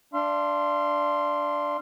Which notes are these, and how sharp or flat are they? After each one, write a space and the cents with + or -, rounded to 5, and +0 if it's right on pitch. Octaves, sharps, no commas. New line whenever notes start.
D4 +0 F5 -40 C6 +0